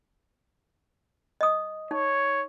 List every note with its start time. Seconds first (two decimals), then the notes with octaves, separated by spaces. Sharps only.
1.41 D#5 D#6
1.91 D#4 C#5